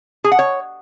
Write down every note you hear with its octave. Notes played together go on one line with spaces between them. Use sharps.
G#4
F#5
C#5